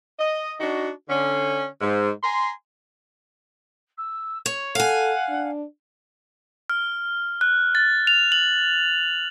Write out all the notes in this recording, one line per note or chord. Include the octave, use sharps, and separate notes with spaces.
D#5
D4 D#4 F#4
D3 C#4
G#2
G#5 A#5 C6
E6
C#5 C#6
A4 F5 F#5 G#5
D4
F6
F#6
A6
F7
F#7